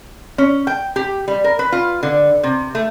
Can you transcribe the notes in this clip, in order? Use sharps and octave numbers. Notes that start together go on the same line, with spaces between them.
C#4
G5
G4
G3
A#4
B4
F4
D3
C3
A3